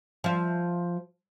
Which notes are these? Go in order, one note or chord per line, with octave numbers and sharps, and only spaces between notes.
F3 E5